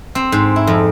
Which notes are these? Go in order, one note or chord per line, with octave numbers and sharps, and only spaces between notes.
C4
G#2
E4
F2